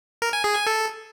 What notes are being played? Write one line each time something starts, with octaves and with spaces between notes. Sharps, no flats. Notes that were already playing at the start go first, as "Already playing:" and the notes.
A#4
G#5
G#4
G#5
A4